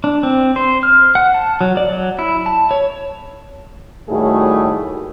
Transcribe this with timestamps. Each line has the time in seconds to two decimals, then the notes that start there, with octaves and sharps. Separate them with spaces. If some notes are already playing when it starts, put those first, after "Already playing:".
0.04 D4
0.23 C4
0.56 C5
0.83 F6
1.15 F#5
1.34 A5
1.61 F#3
1.77 D5
1.92 F#3
2.19 E4
2.46 A5
2.71 C#5
4.08 D#2 A2 G3 A3 F#4 G#4